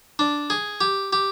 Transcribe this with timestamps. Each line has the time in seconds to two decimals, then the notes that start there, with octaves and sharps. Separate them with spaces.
0.19 D4
0.50 G#4
0.81 G4
1.13 G4